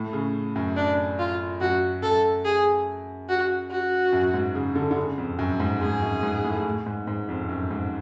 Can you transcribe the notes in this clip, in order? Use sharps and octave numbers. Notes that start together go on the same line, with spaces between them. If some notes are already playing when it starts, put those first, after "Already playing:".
Already playing: A2
C#3
F#2
D4
F4
F#2 F#4
F#2 A4
G#4
F#4
F#4
F#2
G#2
C#3
D3
D3
C#3
F2
F#2
G#2
G#2 G#4
F#2
G#2
A2
G#2
G#2
F2
F#2
G#2